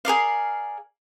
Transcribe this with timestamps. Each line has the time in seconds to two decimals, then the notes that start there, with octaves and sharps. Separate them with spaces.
0.05 G#4 A#4 D5 F5